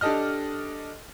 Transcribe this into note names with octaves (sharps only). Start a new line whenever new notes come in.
D4 G4 A4 D#5 F6